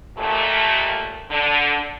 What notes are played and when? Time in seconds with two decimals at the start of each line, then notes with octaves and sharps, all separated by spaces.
0.17 D#2 A#2 A3
1.31 D3